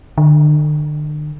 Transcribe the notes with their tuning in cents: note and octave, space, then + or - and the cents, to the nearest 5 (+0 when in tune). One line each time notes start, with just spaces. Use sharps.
D3 +40